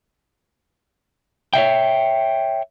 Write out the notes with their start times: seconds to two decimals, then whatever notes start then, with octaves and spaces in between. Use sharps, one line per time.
1.54 C#5 D5 E5 G5